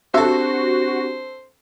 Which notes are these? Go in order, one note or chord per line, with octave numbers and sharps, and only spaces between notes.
C4 D4 F#4 G4 A4 C5 E5